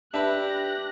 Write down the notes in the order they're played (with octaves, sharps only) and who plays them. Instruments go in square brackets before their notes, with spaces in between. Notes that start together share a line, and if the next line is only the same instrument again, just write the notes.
[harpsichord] D4 B4 [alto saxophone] G4 [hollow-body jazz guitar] E5 B5 [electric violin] F#6 A#6